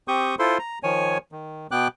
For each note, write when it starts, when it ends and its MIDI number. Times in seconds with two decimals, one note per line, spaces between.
0.08 0.35 60
0.08 0.35 67
0.08 0.35 85
0.08 0.35 87
0.08 0.35 91
0.39 0.58 64
0.39 0.58 65
0.39 0.58 69
0.39 0.58 72
0.39 0.58 84
0.59 0.79 82
0.83 1.18 51
0.83 1.18 53
0.83 1.18 73
0.83 1.18 80
1.32 1.67 51
1.71 1.88 47
1.71 1.88 59
1.71 1.88 79
1.71 1.88 86
1.71 1.88 90